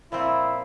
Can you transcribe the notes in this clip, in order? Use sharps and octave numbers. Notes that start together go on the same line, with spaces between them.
A#2 F3 C4 E4